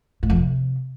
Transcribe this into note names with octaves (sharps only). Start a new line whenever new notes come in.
A2
F2
C3